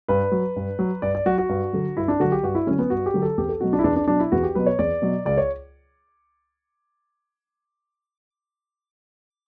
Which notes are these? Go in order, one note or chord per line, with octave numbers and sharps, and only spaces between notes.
G2 B4
F#3
G2
F#3
G2 D5
D5
F#3 F#4
F#4
G2
D3 F#3
G2 E4
D4
D3 F#3 F#4
G4
G2 F#4
E4
D3 F#3 C#4
B3
G2 F#4
G4
D3 F#3
A4
E2 G4
A4
B2 F#3 F#4
D4
E4
E2 D4
D4
B2 F#3 D4
E4
E2 F#4
G4
B2 F#3 B4
C#5
E2 D5
B2 F#3
C#2 D5
C#5